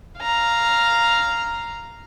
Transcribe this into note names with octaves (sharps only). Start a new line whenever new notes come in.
F5 A#5